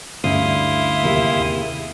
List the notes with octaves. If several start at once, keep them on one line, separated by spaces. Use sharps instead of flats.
D2 G2 C#4 E4 E5 F5 C6 D#6
D#2 C3 G#4